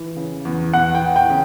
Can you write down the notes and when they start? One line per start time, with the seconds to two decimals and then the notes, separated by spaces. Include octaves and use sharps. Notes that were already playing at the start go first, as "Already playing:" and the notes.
Already playing: E3
0.16 C#3
0.45 E2
0.73 E2 F#5
0.95 G5
1.02 E3
1.16 G5
1.30 C#3